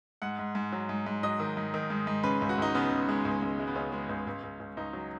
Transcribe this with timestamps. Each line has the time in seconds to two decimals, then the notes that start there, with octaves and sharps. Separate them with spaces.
0.22 G#2 F#5
0.39 G#2
0.55 G#2
0.72 F#3
0.89 G#2
1.06 G#2
1.23 F#3 D#5
1.40 D#3
1.57 G#2
1.74 D#3
1.90 G#2
2.07 G#2
2.24 C#3 B4
2.42 C#2
2.49 F#4
2.58 C#2 D#4
2.75 C#3 B3
2.91 C#3
3.09 G#3
3.25 C#2
3.42 C#2
3.59 G#3
3.68 B3
3.75 C#2 C#4
3.92 G#3
4.09 C#2
4.27 C#2
4.43 C#2
4.60 C#2
4.77 C#2 D#4
4.93 F#3